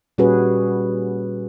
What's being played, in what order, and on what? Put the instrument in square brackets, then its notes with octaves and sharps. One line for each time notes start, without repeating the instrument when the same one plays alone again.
[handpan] A#2 G3 C#4 F#4 G#4 B4